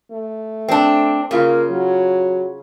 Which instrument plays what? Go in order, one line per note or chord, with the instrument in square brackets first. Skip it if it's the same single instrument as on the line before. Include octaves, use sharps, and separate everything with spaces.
[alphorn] A3
[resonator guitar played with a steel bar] C4 D4
[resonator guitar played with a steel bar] C#3 F4 [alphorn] A#3
[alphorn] F#3